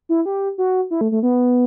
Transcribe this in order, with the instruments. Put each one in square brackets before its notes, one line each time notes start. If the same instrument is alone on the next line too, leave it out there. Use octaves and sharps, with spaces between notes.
[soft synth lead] E4
G4
F#4
E4
A3
A3
B3